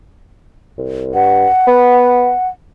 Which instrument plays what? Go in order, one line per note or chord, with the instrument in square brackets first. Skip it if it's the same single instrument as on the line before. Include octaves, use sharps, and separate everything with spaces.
[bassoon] C2
[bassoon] G2 [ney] F#5
[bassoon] B3